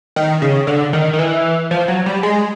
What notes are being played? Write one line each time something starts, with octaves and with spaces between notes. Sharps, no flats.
D#3
C#3
D3
D#3
D#3
E3
F3
F#3
G3
G#3